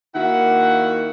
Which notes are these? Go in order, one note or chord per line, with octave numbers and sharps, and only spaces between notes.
D#3 A#3 E4 F#4 F#5